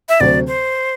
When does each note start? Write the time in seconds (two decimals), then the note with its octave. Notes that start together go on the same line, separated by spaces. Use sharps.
0.09 E5
0.20 D2 C3 F#3 C4 D5
0.47 C5